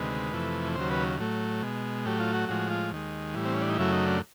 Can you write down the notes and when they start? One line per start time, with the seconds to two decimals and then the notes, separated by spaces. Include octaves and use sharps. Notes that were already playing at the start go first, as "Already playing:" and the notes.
Already playing: D2 C3 D#3 G#3 B4
0.33 F2 C3 E3 A3
0.76 D#2 C#3 F#3 C5
0.91 B4
1.19 A2 F#3 A3
1.63 B2 G#3
2.05 A2 F#3 A3 G4
2.19 F4
2.34 F#4
2.49 A2 F3 G#3 F#4
2.70 F4
2.92 D#2 D#3 G#3
3.35 A2 E3 G3
3.45 C4
3.54 C#4
3.61 D4
3.69 D#4
3.78 F#2 C#3 F#3 A3 E4
3.93 D#4
4.06 D4